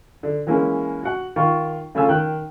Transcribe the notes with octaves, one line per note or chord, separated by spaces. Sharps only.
D3
E3 G#3 A#3 C#4
F#4 F#5
D#3 F4 C#6
C#3 A3 C#4 F4 G#5 E6
D#3 G5 F#6